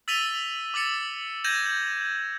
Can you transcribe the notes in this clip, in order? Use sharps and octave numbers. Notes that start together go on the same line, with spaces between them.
E6 A6 B6 D#7 F7 G7
D6 E6 A6 C#7
G6 G#6 A#6 D#7 E7 F#7